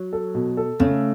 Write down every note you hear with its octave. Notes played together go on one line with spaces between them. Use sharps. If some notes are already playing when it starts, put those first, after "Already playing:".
Already playing: F#3
A4
B2
A4
C#3 A3